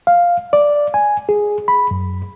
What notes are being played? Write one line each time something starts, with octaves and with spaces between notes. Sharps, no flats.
F5
D5
G#5
G#4
B5
F#2